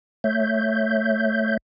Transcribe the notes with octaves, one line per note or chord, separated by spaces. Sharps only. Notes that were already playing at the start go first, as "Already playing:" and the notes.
A3 C#5 E5 G6